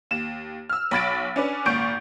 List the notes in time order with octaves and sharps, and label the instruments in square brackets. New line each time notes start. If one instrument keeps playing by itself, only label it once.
[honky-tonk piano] D#2 E7
E6 F6
B1 B5 A6 D7
C#4 D4 B4
G#1 A#2 C#6 G6 D7